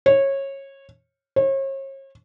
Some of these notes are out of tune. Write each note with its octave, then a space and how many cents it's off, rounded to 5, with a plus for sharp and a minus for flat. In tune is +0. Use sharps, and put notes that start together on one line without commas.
C#5 -20
C#5 -40